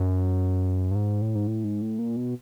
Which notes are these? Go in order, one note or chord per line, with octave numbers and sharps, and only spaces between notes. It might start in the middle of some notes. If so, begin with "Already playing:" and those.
Already playing: F#2
G2
G#2
A2
G#2
A2
G#2
A2
A#2
B2